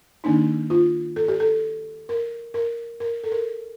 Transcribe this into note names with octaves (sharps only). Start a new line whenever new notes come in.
D#3 A#3 D4 D#4
F4
A4
G4
A4
A#4
A#4
A#4
A4
A#4